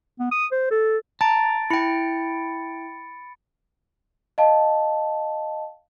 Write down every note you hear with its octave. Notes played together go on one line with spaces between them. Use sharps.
B3
D#6
C5
A4
A5 A#5 A6 D7
E4 G5 B5 C#7
D#5 F5 A5